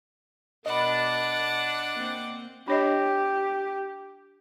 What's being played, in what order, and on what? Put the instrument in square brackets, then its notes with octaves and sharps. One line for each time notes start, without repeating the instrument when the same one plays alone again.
[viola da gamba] B2 A#4 D5 [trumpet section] D4 [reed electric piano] D#5 B5 [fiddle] F#5 D6
[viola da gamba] A#3 C4
[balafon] D4 C#5 D#5 [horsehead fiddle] G4